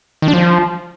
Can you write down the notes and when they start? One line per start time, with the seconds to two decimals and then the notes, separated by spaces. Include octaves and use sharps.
0.22 D#3
0.28 D4
0.34 F3